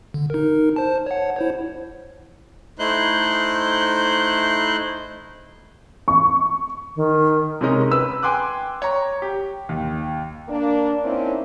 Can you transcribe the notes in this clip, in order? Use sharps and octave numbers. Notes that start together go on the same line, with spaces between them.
D3
D#4 A#4
C5 A5
C#5 F#5
E4 C5 C#5
A3 D#4 E4 C5 F#6 G6
C#6
D#3
C3 G#3 C#4 D#4 A#4
B4 E6
G5 G#5 C6 D6 F#6
C#5 A#5
G4
D#2
A#3 D4
A#3 C4 C#4 D#4 E4